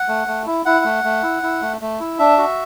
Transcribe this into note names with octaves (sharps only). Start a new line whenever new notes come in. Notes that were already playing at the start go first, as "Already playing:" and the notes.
Already playing: F#5
A3
A3
E4
E4 F#5
A3
A3
E4
E4
A3
A3
E4
D4 E5
F#4